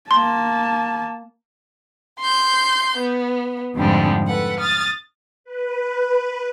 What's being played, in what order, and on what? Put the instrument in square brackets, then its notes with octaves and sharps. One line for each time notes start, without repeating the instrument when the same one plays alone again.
[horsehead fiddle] A#3 A5 [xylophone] C6
[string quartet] C6 G6
B3
F2 G#2 D3 F3 G3 G#3
A4 B4 F#5
D#6 F6 A6
[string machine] B4